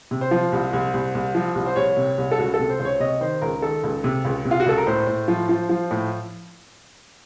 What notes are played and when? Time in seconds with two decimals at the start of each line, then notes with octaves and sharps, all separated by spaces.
0.11 C3
0.21 C5
0.31 F3
0.52 C2
0.73 C2
0.94 C2
1.15 C2
1.35 F3
1.55 C2
1.66 C5
1.76 C2 C#5
1.97 C3
2.18 C2
2.31 A4
2.38 C#2 F#4
2.54 A4
2.59 C3
2.69 C5
2.80 C#2 C5
2.85 C#5
3.00 C3 D#5
3.21 D#3 C5
3.42 C#2 A#4
3.62 D#3 A4
3.83 C#2
4.04 C3
4.25 C#2
4.45 C3
4.51 F4
4.60 F#4
4.66 C#2 A4
4.78 A#4
4.87 A2 C5
5.07 A2
5.28 F3
5.49 F3
5.69 F3
5.91 A2